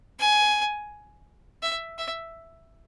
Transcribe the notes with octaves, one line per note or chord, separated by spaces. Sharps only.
G#5
E5
E5